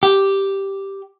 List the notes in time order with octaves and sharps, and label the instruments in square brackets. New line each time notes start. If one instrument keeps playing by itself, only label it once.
[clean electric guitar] G4